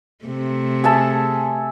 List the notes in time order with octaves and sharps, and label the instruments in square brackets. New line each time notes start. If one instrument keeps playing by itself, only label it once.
[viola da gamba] C3 A3
[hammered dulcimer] G#4 E5 A5